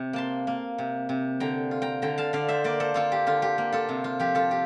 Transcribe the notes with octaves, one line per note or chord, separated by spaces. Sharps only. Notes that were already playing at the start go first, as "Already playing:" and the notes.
Already playing: C3
A#3 A5 C6
A#3
C3
C3
D3 G5 A#5
F4
G5 A#5
D3 G5 A#5
F5 A5
D3 D5 F5
C5 E5
A#3 A#4 D5
A4 C5
A#3 F4 A4
G4
D3 F4
G4
A#3
F4 A4
C3
F4
F3 G4
F4 A4
G4